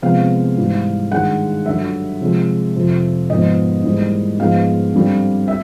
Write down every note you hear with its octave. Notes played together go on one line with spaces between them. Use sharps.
C3 F3 G#3 B3 F5
G#2 E3 G3
G2 D#3 G#3 F#5
G2 D3 F#3 E5
C3 F3 G#3
F2 C3 F3
G#2 F3 G#3 B3 D#5
G#2 E3 G3 A#3
G#2 F3 G#3 B3 F5
G2 D3 G3 C4
E5